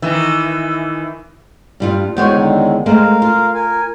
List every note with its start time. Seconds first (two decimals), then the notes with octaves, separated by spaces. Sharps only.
0.02 D#3 E3
1.80 G2 G3 F4
2.17 E2 G#3 F#4 C5 C#5 G5
2.31 D3 D#3
2.86 G#3 A3 C4 A#4 F5
3.22 F4
3.55 A#4 G#5